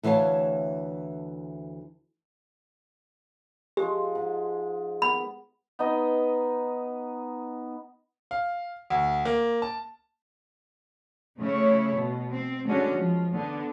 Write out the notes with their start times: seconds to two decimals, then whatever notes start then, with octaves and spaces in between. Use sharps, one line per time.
0.03 D2 E3 C#5 F5 A5
3.77 F3 G#3 G4
4.15 G#2
5.02 B3 A#4 B5
5.79 B3 D#4 D#5
8.31 F5
8.90 D2
9.25 A#3
9.62 A5
11.40 C#3 A3 E4 C#5
11.97 B2
12.31 C4
12.67 D3 G#3 C#4 F#4
12.96 F3
13.33 D3 B3